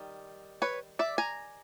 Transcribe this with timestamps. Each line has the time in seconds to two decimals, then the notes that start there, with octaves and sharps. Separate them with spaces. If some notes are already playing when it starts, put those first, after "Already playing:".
Already playing: D#3 G3
0.62 B4 C#5
0.99 D5 E5
1.18 G#5 A#5